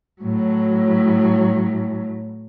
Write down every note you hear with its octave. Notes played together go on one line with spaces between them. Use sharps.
A2 F#3